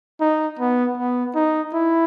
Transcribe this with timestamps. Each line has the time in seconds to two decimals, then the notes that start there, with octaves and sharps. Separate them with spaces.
0.20 D#4
0.59 B3
0.97 B3
1.35 D#4
1.73 E4